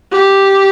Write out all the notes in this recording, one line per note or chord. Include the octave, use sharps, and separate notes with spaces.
G4